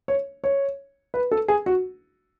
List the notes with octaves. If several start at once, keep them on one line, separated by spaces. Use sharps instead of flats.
C#5
C#5
B4
A4
G#4
F#4